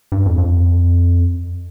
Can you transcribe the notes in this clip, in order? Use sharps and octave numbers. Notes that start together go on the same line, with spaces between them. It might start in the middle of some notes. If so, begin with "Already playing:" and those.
G2
F2
F2